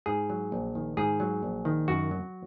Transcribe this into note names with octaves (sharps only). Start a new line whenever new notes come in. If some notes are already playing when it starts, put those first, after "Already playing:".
G#2 G#4
F#3
A#1
D#3
G#2 G#4
F#3
A#1
D#3
F#2 F#4
F#3